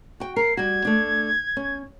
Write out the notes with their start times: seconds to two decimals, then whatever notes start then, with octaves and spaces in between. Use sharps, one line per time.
0.20 F#4 G5
0.36 A#4 C7
0.57 G3 F#4 G#6
0.85 A3 D4
1.57 C#4